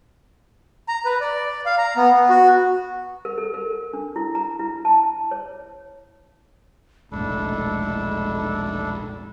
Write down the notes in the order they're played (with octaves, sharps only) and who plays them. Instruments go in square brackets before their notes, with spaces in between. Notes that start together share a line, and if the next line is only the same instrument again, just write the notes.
[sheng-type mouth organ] A#5
B4
D5
F5
A#5
B3
B3
F#4
[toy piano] A#4
A4
A#4
D4
E4
A#5
E4
A5
C#5
[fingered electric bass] E1 A#1 A2 [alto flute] G#3 [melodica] D4 E4 A4